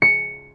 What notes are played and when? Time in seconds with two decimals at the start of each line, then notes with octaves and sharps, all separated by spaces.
0.02 C#7